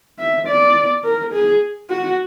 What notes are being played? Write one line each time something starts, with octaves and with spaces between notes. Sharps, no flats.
E5
D5
A#4
G#4
F#4